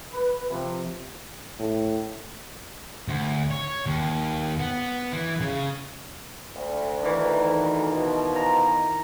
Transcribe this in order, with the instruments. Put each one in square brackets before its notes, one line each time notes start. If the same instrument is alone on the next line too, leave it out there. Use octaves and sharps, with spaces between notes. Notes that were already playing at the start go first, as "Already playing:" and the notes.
[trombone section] B4
C3 F3
[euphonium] A2
[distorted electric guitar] D2
C#5
D#2
B3
E3
C#3
[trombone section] D2
[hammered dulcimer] D#3 E3
[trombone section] B2 F3
[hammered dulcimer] A#5